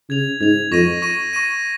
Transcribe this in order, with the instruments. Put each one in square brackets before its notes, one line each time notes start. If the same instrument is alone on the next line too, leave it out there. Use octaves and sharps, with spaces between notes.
[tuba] C#3 [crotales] G#6 F7
[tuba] G#2 [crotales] G#6 F7
[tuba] F2 [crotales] C#6 A#6 D#7
[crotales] C#6 A#6 D#7
C#6 A#6 D#7